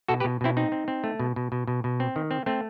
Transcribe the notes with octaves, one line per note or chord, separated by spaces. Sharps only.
B2 F#4 A4
G4 B4
B2
B2 C4 E4
C4 D#4
C4
C4
A3
B2
B2
B2
B2
B2
C4
D#3
C4
A3 C4